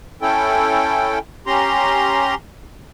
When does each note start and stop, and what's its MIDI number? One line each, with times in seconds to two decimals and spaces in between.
0.22 1.19 61
0.22 1.19 64
0.22 1.19 69
0.22 1.19 79
1.47 2.35 61
1.47 2.35 67
1.47 2.35 82
1.47 2.35 84